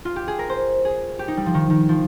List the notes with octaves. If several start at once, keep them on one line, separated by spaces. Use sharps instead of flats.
F4
G4
G#4
A#4
C5
G#4
G4
D#4
G3
F3
D#3
D#3
F3